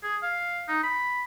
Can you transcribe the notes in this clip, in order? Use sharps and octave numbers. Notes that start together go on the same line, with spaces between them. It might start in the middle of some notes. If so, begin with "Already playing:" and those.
G#4
F5
D#4
B5